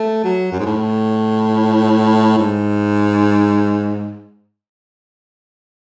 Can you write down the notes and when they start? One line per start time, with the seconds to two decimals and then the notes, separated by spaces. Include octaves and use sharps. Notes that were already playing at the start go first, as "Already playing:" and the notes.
Already playing: A3
0.24 F#3
0.52 F#2
0.59 G#2
0.66 A2
2.38 G#2